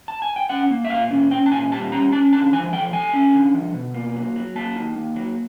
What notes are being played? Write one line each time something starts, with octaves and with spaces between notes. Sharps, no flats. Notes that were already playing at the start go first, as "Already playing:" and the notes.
A5
G#5
G5
C#4 F#5
A#3
E5
A#2 F5
C#4
C#4 G5
A5
A#2 G#5
G3 A5
C#4 A#5
C#4 A5
D3 A5
F3 G#5
A3 G5
A3 G#5
C#4
D3
F3
B2
A#3
F#3
F#3
A#3 A5
D#4
A#3
F#3